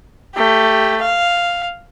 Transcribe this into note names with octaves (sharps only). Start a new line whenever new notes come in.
A3 G4
F5